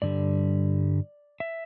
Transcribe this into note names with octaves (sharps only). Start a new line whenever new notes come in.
G2 D3 G3 D5
E5